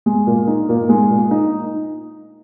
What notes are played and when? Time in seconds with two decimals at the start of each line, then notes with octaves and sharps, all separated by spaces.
0.06 G#3
0.27 A#2
0.47 D#4
0.69 A#2
0.89 G#3
1.10 A#2
1.31 D#4